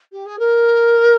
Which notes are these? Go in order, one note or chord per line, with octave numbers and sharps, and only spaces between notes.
G4
G#4
A#4